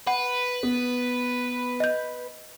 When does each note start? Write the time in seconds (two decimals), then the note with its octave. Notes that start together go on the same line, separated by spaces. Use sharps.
0.07 B4 F#5
0.63 B3
1.80 D#5 G6